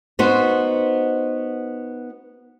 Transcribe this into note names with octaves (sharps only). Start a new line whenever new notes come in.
B3 D#4 F#4 C5